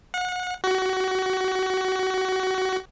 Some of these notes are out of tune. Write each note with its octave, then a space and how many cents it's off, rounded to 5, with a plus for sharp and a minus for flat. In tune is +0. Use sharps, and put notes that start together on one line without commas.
F#5 -30
F#4 +25